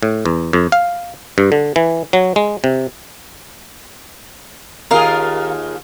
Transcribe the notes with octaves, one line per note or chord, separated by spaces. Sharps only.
A2
E2
F2
F5
G2
D3
E3
F#3
G#3
C3
D#2 F4 G#4 A#4 F5